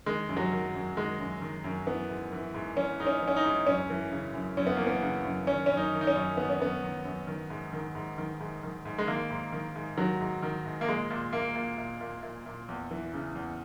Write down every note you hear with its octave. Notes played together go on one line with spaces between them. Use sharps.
D#3 G#3
F#2
F#3
D#3
F#2
D#3 G#3
F#2
D#3
F#2
E3 B3
G#2
E3
G#2
E3 C#4
G#2 D#4
C#4
E3
C#4
D#4
G#2
F#2 C#4
E3
C#3
F#2
F#2 C#4
B3
E3 A#3
B3
C#3
F#2
D#3 C#4
F#2 C#4
D#4
D#3
D#4
C#4
F#2
D#3 B3
C#4
F#2 B3
D#3
F#2
D#3
G#2
D#3
G#2
D#3
G#2
D#3
G#2
G#3
D#3 A#3
G#2
D#3
G#2
D#3 F#3
G#2
D#3
G#2
A#3
A#2 G#3
A#2
A#2 A#3
A#2
A#2
A#2
A#2
A#2
E2
E3
C#3
E2